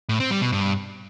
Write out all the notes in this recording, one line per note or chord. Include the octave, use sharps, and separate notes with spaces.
A2
C4
G3
B2
G2